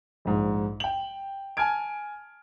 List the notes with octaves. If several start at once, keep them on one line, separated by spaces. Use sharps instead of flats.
A#1 G#2
G5 F#7
G#5 A5 F6 G#6 D7